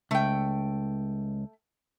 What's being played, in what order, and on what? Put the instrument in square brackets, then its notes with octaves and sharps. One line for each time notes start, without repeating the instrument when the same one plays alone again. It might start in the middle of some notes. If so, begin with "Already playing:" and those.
[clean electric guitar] C#2 [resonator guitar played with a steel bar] A3 G5